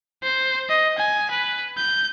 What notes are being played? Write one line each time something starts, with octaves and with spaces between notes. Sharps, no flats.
C5
D#5
G#5
B4
G6